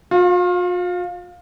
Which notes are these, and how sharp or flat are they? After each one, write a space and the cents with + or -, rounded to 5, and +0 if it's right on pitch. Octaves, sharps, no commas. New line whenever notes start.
F4 +45 F5 +15